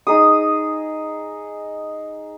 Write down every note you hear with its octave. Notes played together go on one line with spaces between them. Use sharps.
D#4 G#4 D#6